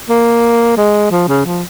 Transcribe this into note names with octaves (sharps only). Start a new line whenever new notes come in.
A#3
G#3
F3
C#3
F3